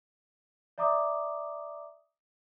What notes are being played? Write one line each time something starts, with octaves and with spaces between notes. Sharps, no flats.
D5 E5 A#5 D6 D#6